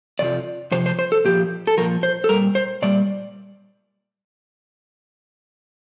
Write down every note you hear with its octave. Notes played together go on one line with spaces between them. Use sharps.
F2 C3 F3 D5
F2 C3 F3 C5
C5
C5
A4
A#2 F3 G4
A4
A#2 F3 A#4
C5
A4
A#2 G3 A#4
C5
A#2 G3 D5